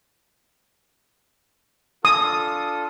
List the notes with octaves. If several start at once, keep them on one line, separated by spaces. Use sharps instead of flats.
D4 F4 A4 D#6